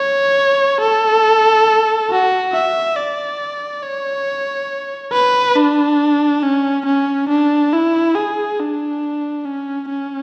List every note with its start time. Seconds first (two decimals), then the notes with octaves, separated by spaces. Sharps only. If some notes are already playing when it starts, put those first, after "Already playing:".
Already playing: C#5
0.81 A4
2.11 F#4
2.53 E5
2.96 D5
3.83 C#5
5.13 B4
5.56 D4
6.43 C#4
6.86 C#4
7.29 D4
7.72 E4
8.15 G#4
8.60 D4
9.46 C#4
9.89 C#4